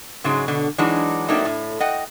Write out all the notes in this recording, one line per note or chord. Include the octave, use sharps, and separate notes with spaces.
G#2 C#3 F#3 G#3
B2 D3
E3 F#3 G#3 D4 D#4 F#4
F#3 A3 A#3 C4 D4 D#4
A2
D#5 F#5 G5